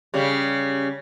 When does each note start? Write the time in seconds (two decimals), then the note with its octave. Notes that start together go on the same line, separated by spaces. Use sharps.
0.14 C#3 G3